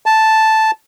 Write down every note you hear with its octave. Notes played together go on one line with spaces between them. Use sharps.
A5